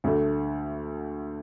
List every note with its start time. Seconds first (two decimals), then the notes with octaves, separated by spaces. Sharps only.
0.04 D2 D3 A3